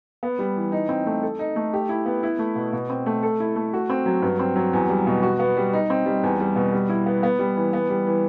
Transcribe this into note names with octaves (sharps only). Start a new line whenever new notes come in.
B3
G3
E3
D#4
C4
A3
A4
D#4
A3
G4
E4
B3
E4
A3
B2
B2
C4
A3
A4
E4
A3
F#4
C4
F#3
G2
C4
F#3
E2
G3
B2
F#4
B3
G3
D#4
C4
G3
E2
G3
B2
G3
E4
B3
B3
G3
E3
B3
G3
E3